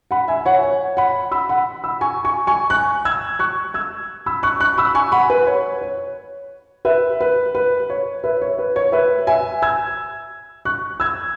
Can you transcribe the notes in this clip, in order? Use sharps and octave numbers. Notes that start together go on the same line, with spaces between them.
F#5 B5
E5 G#5
C#5 F#5
C#5
F#5 B5
B5 E6
F#5 B5
B5 E6
G#5 C#6
G#5 C#6
G#5 C#6
C#6 F#6
E6 G#6
C#6 F#6
E6 G#6
B5 E6
C#6 F#6
C#6 F#6
B5 E6
G#5 C#6
F#5 B5
B4
C#5
C#5
B4 E5
B4
B4
C#5
B4 E5
C#5
B4
C#5
B4 E5
E5 G#5
E6 G#6
C#6 F#6
E6 G#6